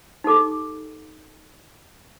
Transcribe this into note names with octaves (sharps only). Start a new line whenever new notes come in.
D#4 G4 A4 D6